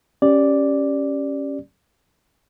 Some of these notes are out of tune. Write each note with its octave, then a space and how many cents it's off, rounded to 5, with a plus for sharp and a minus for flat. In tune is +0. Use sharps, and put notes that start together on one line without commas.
C#4 +0 G4 +0 D5 +0